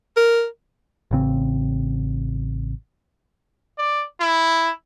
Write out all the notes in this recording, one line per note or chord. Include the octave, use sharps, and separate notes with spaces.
A#4
A1 C#3 C4
D5
E4